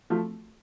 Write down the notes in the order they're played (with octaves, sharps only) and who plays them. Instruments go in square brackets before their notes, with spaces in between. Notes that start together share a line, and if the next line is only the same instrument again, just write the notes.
[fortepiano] F3 A3